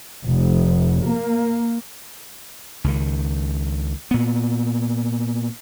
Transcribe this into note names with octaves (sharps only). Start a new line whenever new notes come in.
F1
A#3
C#2 D#3
A#2 B3